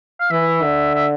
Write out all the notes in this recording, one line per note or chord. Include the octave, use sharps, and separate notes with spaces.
F5
E3 E5
D3
E5